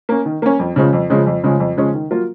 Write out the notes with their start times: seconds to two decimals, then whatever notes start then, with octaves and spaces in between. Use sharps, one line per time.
0.09 A#3 C#4
0.25 D#3
0.42 A#3 C#4
0.59 F2
0.76 C#3 F3 G#3 C#4
0.93 F2
1.10 C#3 F3 G#3 C#4
1.27 F2
1.44 C#3 F3 G#3 C#4
1.60 F2
1.77 C#3 F3 G#3 C#4
1.94 D#3
2.11 F#3 A#3 F4 A#4